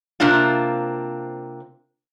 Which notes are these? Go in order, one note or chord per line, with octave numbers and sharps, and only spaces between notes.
C3 A#3 C4 D4 F4